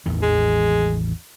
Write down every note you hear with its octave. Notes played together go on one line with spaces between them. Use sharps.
A1 E2 D#3
G#3